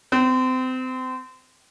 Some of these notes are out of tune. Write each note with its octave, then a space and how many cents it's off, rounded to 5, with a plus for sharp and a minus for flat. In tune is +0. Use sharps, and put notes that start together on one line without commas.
C4 -30